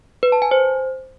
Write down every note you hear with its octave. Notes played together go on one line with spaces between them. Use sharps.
B4
A5
G#5
C5